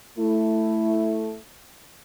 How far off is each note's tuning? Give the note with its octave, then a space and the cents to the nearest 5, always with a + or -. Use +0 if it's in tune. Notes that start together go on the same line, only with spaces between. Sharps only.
A3 +0 E4 +0